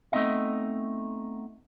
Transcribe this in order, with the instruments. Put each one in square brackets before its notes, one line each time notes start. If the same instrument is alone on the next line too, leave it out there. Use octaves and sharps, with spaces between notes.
[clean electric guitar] A3 B3 C4 D#4 D#5 E5